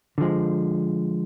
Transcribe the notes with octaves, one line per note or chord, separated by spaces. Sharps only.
D3 F3 G#3